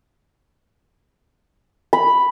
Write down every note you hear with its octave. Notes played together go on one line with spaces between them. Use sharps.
B5